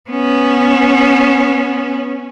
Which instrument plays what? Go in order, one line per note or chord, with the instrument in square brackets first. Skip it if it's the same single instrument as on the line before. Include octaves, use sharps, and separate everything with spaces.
[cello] B3 C#4